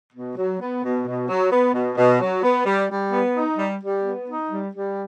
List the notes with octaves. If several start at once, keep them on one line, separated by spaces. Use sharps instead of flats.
B2
F#3
B3
B2
B2
F#3
B3
B2
B2
F#3
B3
G3
G3
B3
D#4
G3
G3
B3
D#4
G3
G3